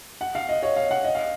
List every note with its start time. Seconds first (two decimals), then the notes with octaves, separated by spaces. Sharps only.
0.21 F#5
0.35 F5
0.49 D#5
0.63 C#5
0.76 F5
0.91 F#5
1.04 D#5
1.15 F5